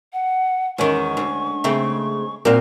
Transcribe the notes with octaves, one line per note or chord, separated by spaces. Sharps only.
F#5
E2 D#3 G#3 C#4 F#5 C#6
D2
C#3 A3 C4
A#2 C4 F4 F#4 A#4 F6